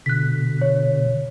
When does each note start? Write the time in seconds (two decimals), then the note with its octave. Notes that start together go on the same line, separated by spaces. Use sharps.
0.06 B2 D3 F#6 B6
0.61 C#5